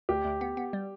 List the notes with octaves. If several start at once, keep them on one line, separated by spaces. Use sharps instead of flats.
D2 G4
D2
B3
B3
G3